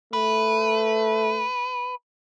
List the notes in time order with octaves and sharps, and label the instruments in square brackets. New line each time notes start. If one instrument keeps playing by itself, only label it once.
[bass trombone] A3 [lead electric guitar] B4